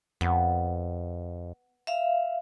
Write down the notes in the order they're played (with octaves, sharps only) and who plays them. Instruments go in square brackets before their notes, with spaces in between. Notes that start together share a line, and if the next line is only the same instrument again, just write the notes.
[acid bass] F2 [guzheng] B3
[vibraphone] E5 F5